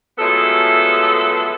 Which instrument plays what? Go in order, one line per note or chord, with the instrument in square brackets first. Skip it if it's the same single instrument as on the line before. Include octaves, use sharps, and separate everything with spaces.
[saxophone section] F3 F#3 G#3 A3 B3 A4